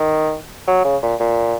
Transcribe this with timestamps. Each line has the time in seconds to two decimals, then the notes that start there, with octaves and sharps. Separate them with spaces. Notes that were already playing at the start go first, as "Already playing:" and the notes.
Already playing: D#3
0.68 F#3
0.85 C#3
1.03 A#2
1.20 A#2